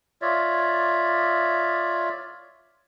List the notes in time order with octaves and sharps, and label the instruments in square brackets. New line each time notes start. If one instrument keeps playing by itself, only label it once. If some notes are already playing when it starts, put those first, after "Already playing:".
[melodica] F4 C#5 D5 E5